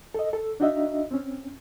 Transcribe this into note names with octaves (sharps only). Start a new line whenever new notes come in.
A4 D#5
A4
D4 D#4 F#4 D#5 E5
C4 C#4